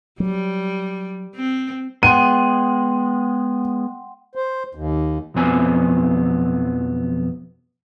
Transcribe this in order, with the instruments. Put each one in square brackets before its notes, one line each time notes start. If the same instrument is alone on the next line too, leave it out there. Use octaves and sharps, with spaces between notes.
[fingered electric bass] F#3 [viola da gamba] G3
[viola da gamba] C4
[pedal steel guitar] G#3 B3 [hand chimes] F#5 G5 C6 [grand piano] D#7
[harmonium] C5
D#2
[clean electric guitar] B1 F2 F3 B3 C4 G#5